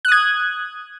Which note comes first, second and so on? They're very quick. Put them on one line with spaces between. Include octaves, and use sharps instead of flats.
F#6 D#6 G#6